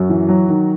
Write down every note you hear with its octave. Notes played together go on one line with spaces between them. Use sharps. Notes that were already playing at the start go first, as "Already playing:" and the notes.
Already playing: F#2 F#4
E3
F#3
D#3